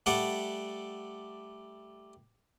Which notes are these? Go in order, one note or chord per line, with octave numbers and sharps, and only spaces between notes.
G3 A3 D5 F#5